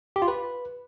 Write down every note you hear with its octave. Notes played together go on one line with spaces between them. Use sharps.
G4
F4
B4